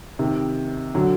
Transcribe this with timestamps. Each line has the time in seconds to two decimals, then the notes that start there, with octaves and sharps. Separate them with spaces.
0.19 C3 D#3
0.95 D3 F#3